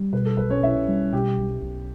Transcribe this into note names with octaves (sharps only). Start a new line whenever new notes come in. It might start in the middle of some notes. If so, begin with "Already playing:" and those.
Already playing: G3
B2 B4
A4
B1 B4
C#4 C#5
B1 E4 E5
G3
B2 G4 G5
B1
B1